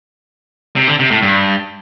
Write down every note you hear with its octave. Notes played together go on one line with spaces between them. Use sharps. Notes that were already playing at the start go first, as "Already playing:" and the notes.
C3
D3
C3
A2
G2